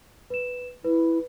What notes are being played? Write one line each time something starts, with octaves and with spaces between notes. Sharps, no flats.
B4 E7
E4 B4